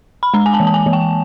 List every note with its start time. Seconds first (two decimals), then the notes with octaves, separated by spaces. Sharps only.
0.23 B5
0.34 G#3 A#5
0.46 G#5
0.54 A5
0.60 E3
0.67 A5
0.74 G#5
0.86 E3
0.93 G5